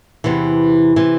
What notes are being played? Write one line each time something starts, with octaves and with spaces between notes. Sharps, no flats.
E2 C3 E3
C3 E3